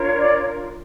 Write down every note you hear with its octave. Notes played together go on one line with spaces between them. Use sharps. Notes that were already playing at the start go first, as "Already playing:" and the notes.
Already playing: D4 F4 A#4 C#5
D5